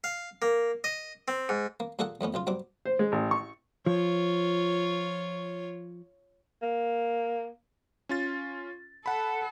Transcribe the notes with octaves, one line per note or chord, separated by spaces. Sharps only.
F5
A#3
D#5
C4
G#2
A#3
A#2 A#3 G#4 A4 F#5
F2 A2 B3 C#4
B1 C#3 F4
G2 F#3 C4 D6
C5
G#3
A1
C#6
F3 F4 C#5
A#3
C#4 F4 A6
A4 F#5 B5